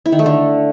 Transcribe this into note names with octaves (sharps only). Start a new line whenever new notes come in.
E4
D#3
A3
D3